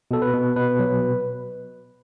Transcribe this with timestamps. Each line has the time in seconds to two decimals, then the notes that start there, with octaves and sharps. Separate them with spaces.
0.11 B2 A4
0.22 B4
0.33 B2
0.56 B2 B4
0.80 F#3